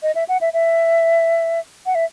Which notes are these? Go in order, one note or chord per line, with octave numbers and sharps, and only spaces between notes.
D#5
E5
F#5
E5
E5
F#5
E5